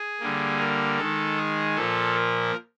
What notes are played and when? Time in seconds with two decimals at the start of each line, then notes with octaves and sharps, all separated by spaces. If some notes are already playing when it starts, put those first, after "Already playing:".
Already playing: G#4
0.20 D3 G3 A#3
0.60 A#4
0.98 D#3 G#3 A4
1.37 G#4
1.76 A#2 F3 A#3 A4
2.16 A#4